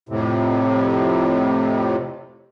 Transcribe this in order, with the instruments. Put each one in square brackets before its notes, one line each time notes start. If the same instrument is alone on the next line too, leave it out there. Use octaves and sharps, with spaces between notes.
[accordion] F2 A2 C3